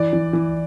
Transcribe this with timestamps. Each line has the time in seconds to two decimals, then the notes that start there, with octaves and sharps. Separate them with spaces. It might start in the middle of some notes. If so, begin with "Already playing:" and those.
Already playing: E3 D5
0.13 E3
0.33 E3